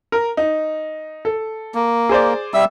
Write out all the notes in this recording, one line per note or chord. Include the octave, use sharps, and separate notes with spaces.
A#4
D#4
A4
A#3
G#4 C5 D5
G3 E5 E6